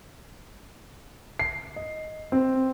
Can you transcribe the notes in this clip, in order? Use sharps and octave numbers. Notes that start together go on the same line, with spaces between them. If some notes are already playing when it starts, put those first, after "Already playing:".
C7
D#5
C4